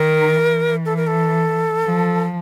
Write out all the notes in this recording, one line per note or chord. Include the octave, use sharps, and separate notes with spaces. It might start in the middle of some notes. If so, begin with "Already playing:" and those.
Already playing: D#3 A#4
E3
A4
A#4
A4
F3